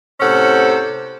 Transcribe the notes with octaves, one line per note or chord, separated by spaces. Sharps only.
A2 C3 C#4 A4 C5 F#5